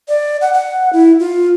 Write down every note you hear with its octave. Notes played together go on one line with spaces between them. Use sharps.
D5
F#5
F#5
E4
F4